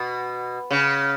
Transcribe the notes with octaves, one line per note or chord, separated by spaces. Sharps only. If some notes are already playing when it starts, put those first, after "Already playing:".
Already playing: B2
C#3